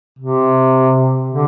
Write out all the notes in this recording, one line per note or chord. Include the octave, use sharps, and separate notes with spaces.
C3
D3